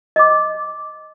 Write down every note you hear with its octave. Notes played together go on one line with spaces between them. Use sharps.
D#5 D6